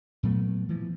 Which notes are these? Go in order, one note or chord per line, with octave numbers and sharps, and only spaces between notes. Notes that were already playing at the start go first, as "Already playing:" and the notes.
A#2 F#3 A3 B3
E3 F3